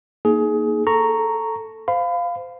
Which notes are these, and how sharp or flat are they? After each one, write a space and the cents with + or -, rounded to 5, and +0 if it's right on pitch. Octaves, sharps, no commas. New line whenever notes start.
A#3 +0 D#4 +0 G#4 +20
A4 +0 A#5 -5 C#6 +0
C5 -20 F5 +0 B5 +30